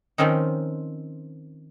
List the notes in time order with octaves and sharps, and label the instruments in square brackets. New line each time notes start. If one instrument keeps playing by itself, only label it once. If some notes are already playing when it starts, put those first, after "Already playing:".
[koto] D#3 F3 C4 C#4 D#4